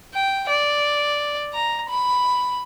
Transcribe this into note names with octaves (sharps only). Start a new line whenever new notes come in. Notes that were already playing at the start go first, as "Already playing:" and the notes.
G5
D5
A#5
B5